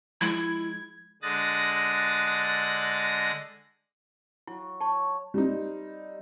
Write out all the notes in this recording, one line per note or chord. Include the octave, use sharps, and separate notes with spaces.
F3 G#3 E4 G#6
D3 G#3 D#6 F#6 A6 A#6
F#3 E4
C#5 A5 C#6
G3 C4 D#4